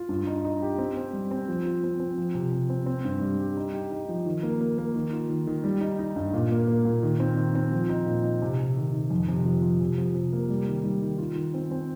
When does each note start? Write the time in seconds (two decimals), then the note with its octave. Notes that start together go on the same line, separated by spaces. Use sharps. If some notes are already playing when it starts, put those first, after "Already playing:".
Already playing: F4
0.09 G2
0.27 D#4
0.45 D#4
0.62 G4
0.78 C4
0.97 C4
1.13 G3
1.31 C4
1.48 F3
1.66 F4
1.83 C4
2.00 C4
2.18 F3
2.35 C3
2.52 C3
2.70 C4
2.86 C4
3.05 G2
3.21 G3
3.39 G4
3.57 D#4
3.73 G4
3.91 D#4
4.09 F3
4.26 D#3
4.43 A#3
4.61 A#3
4.78 A#3
4.95 D#3
5.13 F4
5.30 D#3
5.47 D#3
5.64 G3
5.81 D#4
5.99 D#4
6.16 G2
6.34 A#2
6.51 A#3
6.68 A#3
6.85 A#2
7.03 D#3
7.20 C4
7.37 D#3
7.55 C4
7.72 F3
7.89 D#4
8.06 A#2
8.24 D#4
8.42 C3
8.59 C3
8.77 D#3
8.94 D#3
9.10 F2
9.29 C3
9.45 F3
9.62 F3
9.81 C3
9.98 F3
10.15 C3
10.33 A#3
10.50 G3
10.67 D#3
10.84 G3
11.02 D#3
11.18 F4
11.36 D#3
11.54 C4
11.71 C4